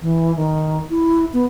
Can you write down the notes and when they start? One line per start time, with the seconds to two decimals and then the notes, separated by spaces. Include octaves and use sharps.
0.01 E3
0.36 D#3
0.90 E4
1.33 B3